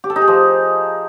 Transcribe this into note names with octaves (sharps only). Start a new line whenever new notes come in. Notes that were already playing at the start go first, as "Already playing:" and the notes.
G4
A4
D#4
G#4
F3